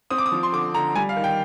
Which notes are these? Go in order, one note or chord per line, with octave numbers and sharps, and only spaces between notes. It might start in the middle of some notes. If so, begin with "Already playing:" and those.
C4 D#6
D6
D#6
F3
C6
D3 D6
D3 A#5
G3 G#5
F5
D#3
G5